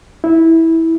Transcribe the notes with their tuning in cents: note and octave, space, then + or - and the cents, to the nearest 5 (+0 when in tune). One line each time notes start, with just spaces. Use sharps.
E4 -15